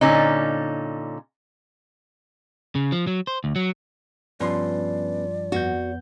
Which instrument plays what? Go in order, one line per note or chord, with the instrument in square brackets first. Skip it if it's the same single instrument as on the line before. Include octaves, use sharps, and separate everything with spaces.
[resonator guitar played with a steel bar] A#2 D3 C#4 D#4
[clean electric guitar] C#3
F3
F#3
C5
D2
F#3
[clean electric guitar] G2 F3 C6 [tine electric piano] B3 C#4 B4 [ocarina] D5
[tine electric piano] F2 B3 G6 [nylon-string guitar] F#4